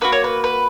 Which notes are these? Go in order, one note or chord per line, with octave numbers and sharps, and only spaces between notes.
A#3 D#4 F#4 B4
C#5
B4
B4